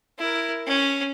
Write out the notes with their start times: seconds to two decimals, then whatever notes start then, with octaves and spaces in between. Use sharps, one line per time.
0.18 E4 A#4
0.67 C#4